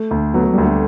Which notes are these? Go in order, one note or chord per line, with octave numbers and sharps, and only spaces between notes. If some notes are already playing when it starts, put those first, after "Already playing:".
Already playing: A3
D2
F#3 B3
A3
G3
D2
A3